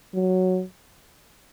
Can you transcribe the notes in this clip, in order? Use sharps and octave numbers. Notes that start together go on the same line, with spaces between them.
F#3